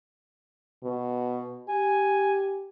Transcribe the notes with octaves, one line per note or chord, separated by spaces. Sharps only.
B2
G4 G#5